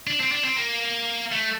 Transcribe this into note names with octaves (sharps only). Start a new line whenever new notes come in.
D4
C4
D4
C4
A#3
A3